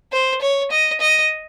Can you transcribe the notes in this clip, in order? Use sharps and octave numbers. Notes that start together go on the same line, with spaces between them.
C5
C#5
D#5
D#5